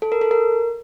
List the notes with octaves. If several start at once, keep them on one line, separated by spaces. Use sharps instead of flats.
A4
A#4
A4
A#4